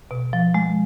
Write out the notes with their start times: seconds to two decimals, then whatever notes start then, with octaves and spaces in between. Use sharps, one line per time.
0.11 B2
0.33 F3
0.54 G#3